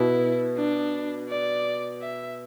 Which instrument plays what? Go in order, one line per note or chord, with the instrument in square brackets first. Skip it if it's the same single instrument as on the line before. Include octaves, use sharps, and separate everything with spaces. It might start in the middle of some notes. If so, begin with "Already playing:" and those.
Already playing: [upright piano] B2 B3 [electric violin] E4
[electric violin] D4
D5
E5